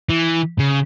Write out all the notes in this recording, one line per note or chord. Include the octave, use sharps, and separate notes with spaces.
E3
C#3